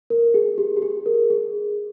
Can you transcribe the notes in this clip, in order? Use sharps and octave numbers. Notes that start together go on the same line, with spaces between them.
A#4
G#4
G4
G4
G#4
A#4
G#4